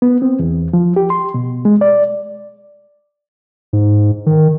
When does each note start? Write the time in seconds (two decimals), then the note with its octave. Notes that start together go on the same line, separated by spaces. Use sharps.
0.02 B3
0.22 C4
0.39 E2
0.73 F3
0.96 G4
1.10 C6
1.34 B2
1.65 G#3
1.81 D5
3.73 G#2
4.26 D#3